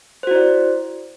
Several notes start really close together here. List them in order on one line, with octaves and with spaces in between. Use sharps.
C5 F#4 E4 D5